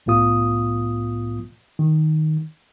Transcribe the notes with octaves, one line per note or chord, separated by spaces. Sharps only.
C2 A2 B3 F4 D#6
D#3